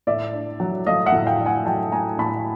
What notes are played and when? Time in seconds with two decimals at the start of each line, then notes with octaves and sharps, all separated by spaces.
0.07 A2 D5 E5
0.33 D4
0.60 F#3
0.87 A3 D#5 F5
1.06 E5 F#5
1.12 A2
1.26 F5 G5
1.39 D4
1.46 F#5 G#5
1.66 F#3 G5 A5
1.92 A3 G#5 A#5
2.19 A2 A5 B5